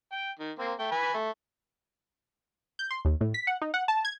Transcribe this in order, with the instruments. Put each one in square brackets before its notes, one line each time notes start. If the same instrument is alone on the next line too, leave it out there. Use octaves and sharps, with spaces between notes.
[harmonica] G5
D#3
A#3 C4
A3 G5
B4 G#5 B5
A3
[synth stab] G6
C6
D#2
A2
B6
F#5
D#4
F#5
A5
G#6